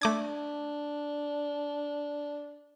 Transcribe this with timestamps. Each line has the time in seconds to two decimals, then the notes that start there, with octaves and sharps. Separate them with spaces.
0.02 A3 D4 D6 G#6